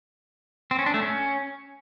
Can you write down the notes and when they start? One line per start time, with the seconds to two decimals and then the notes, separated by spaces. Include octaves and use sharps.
0.71 C4
0.79 C#4
0.86 D4
0.94 A3
1.02 C#4